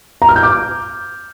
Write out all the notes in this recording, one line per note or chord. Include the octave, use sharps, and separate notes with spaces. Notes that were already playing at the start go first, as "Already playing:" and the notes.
A#5
F6
G6
D6